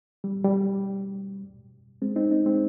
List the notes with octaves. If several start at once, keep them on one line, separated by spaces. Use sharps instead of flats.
G3
G3
G#3 C4
C4 D#4
C4 D#4
G#3 C4